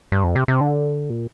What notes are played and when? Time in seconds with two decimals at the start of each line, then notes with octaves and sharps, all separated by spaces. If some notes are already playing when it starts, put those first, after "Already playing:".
0.12 G2
0.24 F2
0.35 C3
0.48 C3
0.61 D3
1.10 A#2